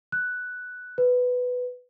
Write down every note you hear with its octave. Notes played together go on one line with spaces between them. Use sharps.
F#6
B4